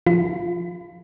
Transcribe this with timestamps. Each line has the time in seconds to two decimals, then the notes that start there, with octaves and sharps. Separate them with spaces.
0.07 F3 F4